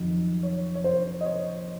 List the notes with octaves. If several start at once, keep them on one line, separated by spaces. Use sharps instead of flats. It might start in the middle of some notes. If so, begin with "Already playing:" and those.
Already playing: F2 D#3 F#3
C#5
C#5
C5
D#5
C#5